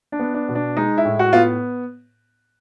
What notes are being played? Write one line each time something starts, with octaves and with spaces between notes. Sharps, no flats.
D4
B3
D4
B2
D4
G#3 D#4
E4
A2
F#4
B3 F4